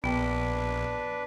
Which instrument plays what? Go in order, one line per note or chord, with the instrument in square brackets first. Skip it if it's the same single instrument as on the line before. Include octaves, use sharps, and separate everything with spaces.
[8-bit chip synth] A#1 [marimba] B3 G5 [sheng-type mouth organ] D4 B4